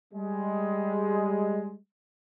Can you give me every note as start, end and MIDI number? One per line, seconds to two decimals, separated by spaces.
0.14 1.75 55
0.14 1.75 56